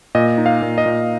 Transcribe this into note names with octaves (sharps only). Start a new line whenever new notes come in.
A#2 D#5
D#4
F5
A#2
D#5
A#2